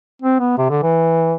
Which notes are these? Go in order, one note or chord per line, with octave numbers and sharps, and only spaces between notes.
C4
B3
C3
D3
E3